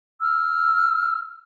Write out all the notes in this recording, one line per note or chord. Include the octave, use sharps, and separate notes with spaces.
E6 F6